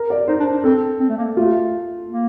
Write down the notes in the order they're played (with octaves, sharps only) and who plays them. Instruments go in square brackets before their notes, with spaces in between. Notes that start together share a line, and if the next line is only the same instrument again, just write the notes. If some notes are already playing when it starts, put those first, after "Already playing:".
Already playing: [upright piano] A#4
D5
[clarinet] D#4 [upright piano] C5
[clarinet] D4
D4
[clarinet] C4 [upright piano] A4
[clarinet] C4
A3
A#3
[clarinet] A3 [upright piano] F4
[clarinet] A#3